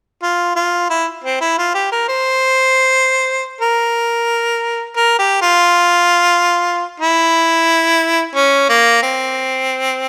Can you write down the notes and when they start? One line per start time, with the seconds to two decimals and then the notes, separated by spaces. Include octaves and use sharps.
0.23 F4
0.56 F4
0.90 E4
1.24 C4
1.41 E4
1.58 F4
1.74 G4
1.92 A#4
2.08 C5
3.61 A#4
4.96 A#4
5.19 G4
5.42 F4
7.00 E4
8.35 C#4
8.69 A#3
9.03 C4